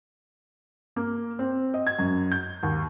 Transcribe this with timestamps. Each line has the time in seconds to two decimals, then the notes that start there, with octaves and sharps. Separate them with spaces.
0.96 A#3
1.39 C4
1.74 D#5
1.87 G#6
1.99 F#2
2.32 G6
2.63 D#2